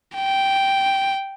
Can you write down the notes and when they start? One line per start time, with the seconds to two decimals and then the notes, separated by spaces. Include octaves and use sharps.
0.16 G5